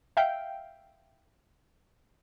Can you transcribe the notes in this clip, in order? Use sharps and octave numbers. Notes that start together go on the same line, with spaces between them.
E5 F5 G5